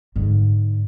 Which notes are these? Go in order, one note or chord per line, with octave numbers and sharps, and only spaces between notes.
G#2 D3